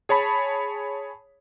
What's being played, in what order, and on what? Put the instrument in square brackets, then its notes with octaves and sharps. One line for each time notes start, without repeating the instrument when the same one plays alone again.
[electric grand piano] G#4 C#5 A5 B5